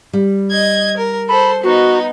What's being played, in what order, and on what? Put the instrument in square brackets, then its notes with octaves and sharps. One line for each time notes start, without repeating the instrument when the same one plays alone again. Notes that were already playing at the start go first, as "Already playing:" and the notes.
[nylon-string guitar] G3
[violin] D#5 G#6
A#4
[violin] A4 C5 [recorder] B5
[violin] B3 D#4 [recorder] F#4